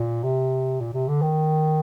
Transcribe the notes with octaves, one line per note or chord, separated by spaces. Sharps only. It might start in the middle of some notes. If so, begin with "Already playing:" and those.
Already playing: A#2
C3
A#2
C3
D3
D#3